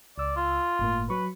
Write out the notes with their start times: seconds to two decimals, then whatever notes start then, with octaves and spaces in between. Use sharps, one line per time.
0.18 C#2 D5 E6
0.36 F4
0.79 G1 A2 A#3
1.10 F#3 B4 C#6